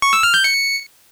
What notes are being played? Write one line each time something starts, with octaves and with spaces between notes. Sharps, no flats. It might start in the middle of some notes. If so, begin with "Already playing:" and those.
C#6
E6
F6
G6
C#7